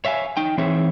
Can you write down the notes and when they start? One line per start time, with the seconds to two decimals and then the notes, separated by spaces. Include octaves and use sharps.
0.05 C#5 E5 F5 G#5
0.37 D#4 G5
0.58 E3 C4 D#4 G#4 C#5 E5